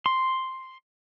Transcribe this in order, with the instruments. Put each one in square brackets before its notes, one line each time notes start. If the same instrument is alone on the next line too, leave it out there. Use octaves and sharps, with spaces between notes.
[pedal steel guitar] C6